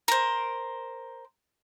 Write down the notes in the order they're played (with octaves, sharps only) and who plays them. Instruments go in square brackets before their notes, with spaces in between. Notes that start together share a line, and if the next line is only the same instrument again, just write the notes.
[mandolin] A#4 C5